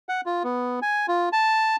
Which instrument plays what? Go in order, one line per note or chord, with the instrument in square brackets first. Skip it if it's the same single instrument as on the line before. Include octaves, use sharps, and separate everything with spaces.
[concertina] F#5
F4
B3
G#5
F4
A5